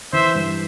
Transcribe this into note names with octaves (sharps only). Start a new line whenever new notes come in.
E3 C5 E5
G2